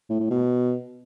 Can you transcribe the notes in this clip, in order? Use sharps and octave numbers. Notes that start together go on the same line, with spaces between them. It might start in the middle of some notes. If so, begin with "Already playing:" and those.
A2
A2
B2